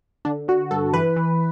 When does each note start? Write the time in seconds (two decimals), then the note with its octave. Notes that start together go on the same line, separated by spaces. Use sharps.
0.25 D3 D4
0.48 D3 F#4
0.71 G2 A4
0.93 E3 B4
1.16 E3